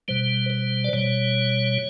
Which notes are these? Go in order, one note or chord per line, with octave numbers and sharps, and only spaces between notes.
B2 G3 C5
C5
D5
B2 G3 C#5